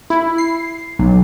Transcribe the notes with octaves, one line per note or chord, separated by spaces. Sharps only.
E4
C7
B1